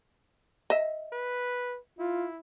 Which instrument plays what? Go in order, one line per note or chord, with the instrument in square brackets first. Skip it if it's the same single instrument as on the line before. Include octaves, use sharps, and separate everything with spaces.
[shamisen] D#5 E5
[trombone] B4
[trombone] E4 [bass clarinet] F4